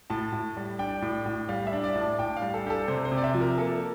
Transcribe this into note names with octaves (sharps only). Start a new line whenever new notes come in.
A2 A5
A2
G3
D4 G5
A2
A2
G3 F5
E5
D4
D5
A2
A5
A2 G5
F5
G3
A4
D4 G4
A4
C3 C5
C5
C3
D5
E5
F3
A#4
A#3 A4